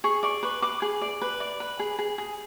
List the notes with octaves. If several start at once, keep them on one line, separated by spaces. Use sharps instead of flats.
G#4 C#6
D5 C#6
B4 C#6
B4 D6
G#4
D5
B4
D5
B4
G#4
G#4
G#4